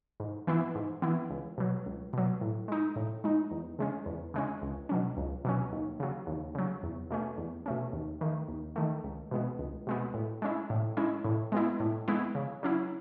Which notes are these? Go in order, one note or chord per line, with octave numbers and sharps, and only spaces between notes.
G#2
E3 B3 E4
G#2
E3 B3 E4
C#2
B2 F#3
C#2
B2 F#3
A2
G#3 D#4
A2
G#3 D#4
E2
C#3 G#3 C#4
E2
C#3 G#3 C#4
C#2
B2 F#3 C#4
C#2
B2 F#3 C#4
D#2
C#3 F#3
D#2
C#3 F#3
E2
B2 A3 C#4
E2
B2 A3 C#4
D#2
D#3 A3
D#2
D#3 A3
C#2
B2 G#3 B3
C#2
B2 G#3 B3
A2
G#3 C#4 E4
A2
G#3 C#4 E4
A2
G#3 B3 E4
A2
G#3 B3 E4
C#3
F#3 C#4 E4